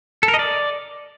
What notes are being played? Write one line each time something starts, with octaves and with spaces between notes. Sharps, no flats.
A4
A#4
D#5
D5